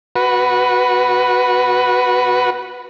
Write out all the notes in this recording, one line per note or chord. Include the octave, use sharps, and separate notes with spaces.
F#4 B4